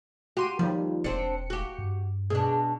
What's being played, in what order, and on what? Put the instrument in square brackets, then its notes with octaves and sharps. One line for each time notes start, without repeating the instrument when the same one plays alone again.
[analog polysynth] F#4 C6 D#7 [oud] G4
[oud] D#2 [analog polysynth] F3 G3
[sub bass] E1 [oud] C4 D4 [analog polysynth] C#7
[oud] F#4 G4
[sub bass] G2
[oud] B2 D4 [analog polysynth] G#4